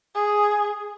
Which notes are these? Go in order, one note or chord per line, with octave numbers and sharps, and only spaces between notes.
G#4